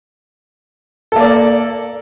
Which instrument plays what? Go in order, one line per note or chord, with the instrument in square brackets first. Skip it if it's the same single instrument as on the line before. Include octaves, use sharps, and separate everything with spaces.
[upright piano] A4
A#3
D5